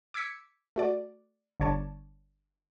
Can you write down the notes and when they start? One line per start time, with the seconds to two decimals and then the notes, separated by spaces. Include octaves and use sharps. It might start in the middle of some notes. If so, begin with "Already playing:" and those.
0.14 D6 E6 G#6 B6 C#7
0.76 A3 F#4 D5
1.60 G1 D3 C#5 D5 A5